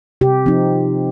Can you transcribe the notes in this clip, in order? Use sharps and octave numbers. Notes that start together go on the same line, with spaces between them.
C3 G4
F3 C4 D#4